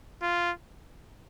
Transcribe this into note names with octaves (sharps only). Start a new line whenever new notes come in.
F4